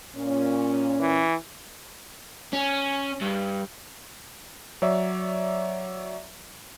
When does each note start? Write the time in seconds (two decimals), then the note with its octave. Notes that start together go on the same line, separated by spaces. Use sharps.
0.16 A#2 C#4
1.00 E3
2.53 C#4
3.21 G2
4.82 F#3 C#5 D5 E5